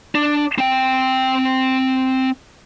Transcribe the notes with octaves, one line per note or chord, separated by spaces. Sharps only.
D4
C4 G5